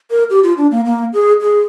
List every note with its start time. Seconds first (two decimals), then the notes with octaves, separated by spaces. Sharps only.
0.11 A#4
0.30 G4
0.44 F4
0.57 D4
0.71 A#3
0.85 A#3
1.13 G#4
1.41 G#4